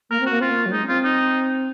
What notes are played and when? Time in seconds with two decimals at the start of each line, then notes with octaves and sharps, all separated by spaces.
0.10 A#3 A#4
0.20 C4
0.26 A#3 F#4
0.41 C4 F4
0.51 A#3
0.66 F#3
0.72 G#3 D#4
0.84 C#4
0.88 C4 F4
1.04 D#4